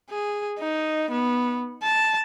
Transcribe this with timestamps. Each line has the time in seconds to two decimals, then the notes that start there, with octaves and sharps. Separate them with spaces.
0.10 G#4
0.60 D#4
1.11 B3
1.83 A5